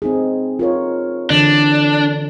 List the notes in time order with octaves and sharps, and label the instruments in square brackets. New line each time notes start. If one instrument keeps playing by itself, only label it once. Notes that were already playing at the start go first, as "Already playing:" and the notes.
[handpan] C4 D#4 G#4
F4 A#4 C#5
[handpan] D3 E3 [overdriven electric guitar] D4